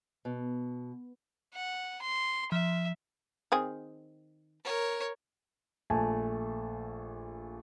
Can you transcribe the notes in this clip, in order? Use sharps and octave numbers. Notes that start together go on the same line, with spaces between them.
B2
F#5
C6
F3 E5
D#3 C4 G#4
A#4 C#5
A#1 A3 G#5 A5